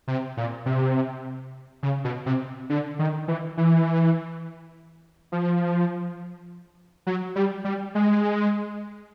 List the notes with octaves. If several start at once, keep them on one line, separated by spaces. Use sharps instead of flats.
C3
A#2
C3
C#3
B2
C3
D3
D#3
E3
E3
F3
F#3
G3
G3
G#3